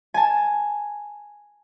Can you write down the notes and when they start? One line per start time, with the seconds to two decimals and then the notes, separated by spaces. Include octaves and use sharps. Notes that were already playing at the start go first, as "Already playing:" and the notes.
0.14 G#5 A5